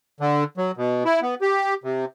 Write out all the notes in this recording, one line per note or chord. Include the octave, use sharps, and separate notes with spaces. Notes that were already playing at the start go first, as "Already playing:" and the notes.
D3
F#3
B2
E4
B3
G4
C3